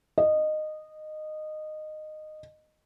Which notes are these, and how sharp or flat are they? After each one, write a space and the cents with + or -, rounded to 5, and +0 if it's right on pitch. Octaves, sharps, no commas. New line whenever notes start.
D#5 -15